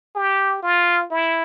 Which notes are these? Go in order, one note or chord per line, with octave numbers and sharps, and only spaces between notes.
G4
F4
E4